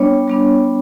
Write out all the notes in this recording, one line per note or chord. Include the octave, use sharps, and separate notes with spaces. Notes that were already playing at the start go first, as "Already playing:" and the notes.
Already playing: G3 B3 D4 C#5
G3 B3 D4